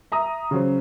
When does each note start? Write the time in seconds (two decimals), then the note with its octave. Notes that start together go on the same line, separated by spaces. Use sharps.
0.12 E5 A#5 D#6
0.51 C#3 F#3 C5